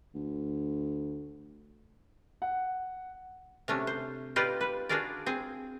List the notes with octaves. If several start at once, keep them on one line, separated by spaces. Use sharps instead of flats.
D2
F#5
C3 A3 C#4 D4
C5
D#4 F4 G4 B4 C5 D5
B4
D4 F4 F#4 G#4 A#4 D5
C4 G#4